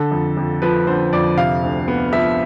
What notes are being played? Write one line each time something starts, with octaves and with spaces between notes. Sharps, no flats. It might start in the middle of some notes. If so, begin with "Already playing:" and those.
Already playing: D3 A4
F2
F2
F3 B4
D3 C5
F2 D5
C3 F5
D2
B3
F3 E5